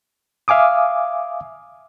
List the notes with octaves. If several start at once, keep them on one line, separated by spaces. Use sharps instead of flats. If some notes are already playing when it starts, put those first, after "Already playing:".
E5 F5 G#5 D6 D#6